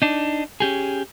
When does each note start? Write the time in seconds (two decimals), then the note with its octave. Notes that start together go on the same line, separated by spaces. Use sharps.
0.02 D4 D#4
0.60 C#4 G4 G#4